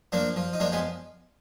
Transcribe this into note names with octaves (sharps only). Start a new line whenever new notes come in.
F3 A#3 D4
F3
D#4
F3 A#3 D4
G#3 B3